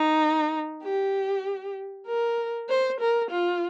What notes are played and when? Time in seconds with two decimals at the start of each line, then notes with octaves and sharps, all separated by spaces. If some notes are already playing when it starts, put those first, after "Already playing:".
Already playing: D#4
0.83 G4
2.07 A#4
2.69 C5
3.00 A#4
3.31 F4